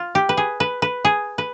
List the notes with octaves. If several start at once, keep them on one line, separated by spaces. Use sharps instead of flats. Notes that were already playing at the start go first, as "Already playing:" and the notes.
Already playing: F4
G4
B4
G#4
B4
B4
G#4
B4